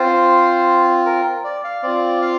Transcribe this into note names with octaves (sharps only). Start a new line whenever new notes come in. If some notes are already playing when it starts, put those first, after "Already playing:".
Already playing: C4 F4 C5
A#4
D5
F5
C4 F4 D5
F5